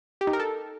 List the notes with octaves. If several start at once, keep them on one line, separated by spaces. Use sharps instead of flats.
G4
D#4
A#4
A4